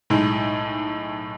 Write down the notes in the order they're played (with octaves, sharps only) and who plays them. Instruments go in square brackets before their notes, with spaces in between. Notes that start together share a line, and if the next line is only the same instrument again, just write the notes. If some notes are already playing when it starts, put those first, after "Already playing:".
[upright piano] B1 A2 G#3 D#4